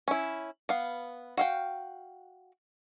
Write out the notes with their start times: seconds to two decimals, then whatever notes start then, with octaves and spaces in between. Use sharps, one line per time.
0.08 C#4 E4
0.69 B3 F5
1.37 F#4 F5 G5